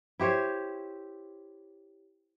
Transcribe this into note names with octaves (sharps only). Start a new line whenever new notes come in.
E4 G4 C5 C#5